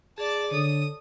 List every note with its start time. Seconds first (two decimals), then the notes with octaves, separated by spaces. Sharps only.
0.18 G#4 D5 A5
0.52 D3 A4 C#5 D#6